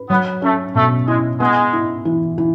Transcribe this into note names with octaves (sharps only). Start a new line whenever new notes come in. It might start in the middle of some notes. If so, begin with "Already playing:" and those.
Already playing: B4
F#3 B3
A3 C#4
B2 A3
G#3 E4
G#3 B3
E4
E3
E3